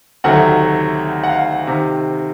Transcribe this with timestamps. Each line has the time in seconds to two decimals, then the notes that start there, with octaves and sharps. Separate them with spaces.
0.24 D2 C3 D#3 F#3 A3 F#5
1.24 F#5
1.29 F5
1.67 C3 D#3